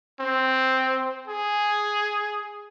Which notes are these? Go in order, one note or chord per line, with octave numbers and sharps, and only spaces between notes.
C4
G#4